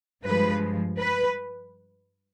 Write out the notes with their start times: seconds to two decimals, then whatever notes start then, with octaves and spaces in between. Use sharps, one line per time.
0.25 G2 F3 G#3 B4
0.99 B4